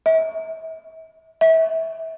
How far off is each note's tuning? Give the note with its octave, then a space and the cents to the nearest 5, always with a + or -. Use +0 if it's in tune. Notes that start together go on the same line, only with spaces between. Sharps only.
E5 -40
E5 -30